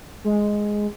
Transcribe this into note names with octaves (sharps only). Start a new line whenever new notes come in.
G#3